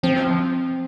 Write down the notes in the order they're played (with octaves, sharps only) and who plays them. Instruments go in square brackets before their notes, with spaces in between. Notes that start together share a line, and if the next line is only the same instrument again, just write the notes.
[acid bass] F3 [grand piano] C4